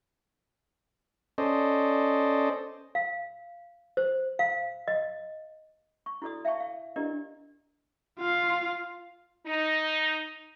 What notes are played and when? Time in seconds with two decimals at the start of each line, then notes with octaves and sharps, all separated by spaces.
1.38 C#4 A4 C5 D5 D#5
2.95 F5
3.97 C5
4.39 F5
4.88 D#5
6.06 C#6
6.22 E4 F#4 A4 D5 D#6
6.45 E5 F5 G5 A5 C#6
6.60 F5
6.96 D4 E4 G4 A#4 D5 D#5
8.19 F4 F5
9.46 D#4